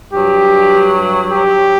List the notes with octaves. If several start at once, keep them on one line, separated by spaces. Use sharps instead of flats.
G2 F#3 G4
G4